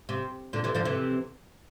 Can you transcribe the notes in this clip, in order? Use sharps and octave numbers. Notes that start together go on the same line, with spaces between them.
C3
A#2 D3
C3 E3
D3 F3
C3 E3